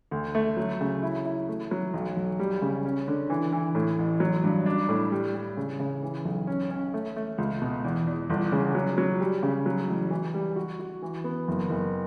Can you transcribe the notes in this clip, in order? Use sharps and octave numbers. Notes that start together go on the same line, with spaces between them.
D2
A3
F#3
C#3
E4
E4
A3
F#3
B1
B1
G3
C#3
C#4
D3
E3
E3
A2
A1
F#3
G2
D4
A2
G3
G3
C#3
C#3
E3
B1
C#4
C#4
A3
A3
C#2
B2
E2
E2
G1
C#3
F#3
F#3
G3
C#3
F#3
A1
E3
G3
F#4
F#4
E3
B3
F#1
F#1